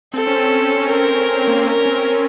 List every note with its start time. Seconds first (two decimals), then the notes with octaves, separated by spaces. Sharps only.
0.14 C4 A4
0.27 C#4
0.40 C4
0.53 C#4
0.66 C4
0.80 C#4
0.90 C4 A#4
1.47 A#3
1.57 C4
1.66 C#4 A#4
1.86 C4
1.98 C4
2.05 C#4